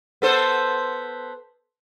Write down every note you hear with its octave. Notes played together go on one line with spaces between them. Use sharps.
B3 A4 C5